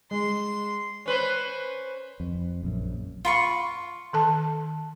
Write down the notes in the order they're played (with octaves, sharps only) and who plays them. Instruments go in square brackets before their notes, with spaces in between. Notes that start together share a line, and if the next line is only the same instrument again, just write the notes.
[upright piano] G#3 [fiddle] C6
[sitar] C#4 B4 C5
[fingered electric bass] F2
A#1 F#2
[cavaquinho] F4 B5 C#6
[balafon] D#3 A4 A5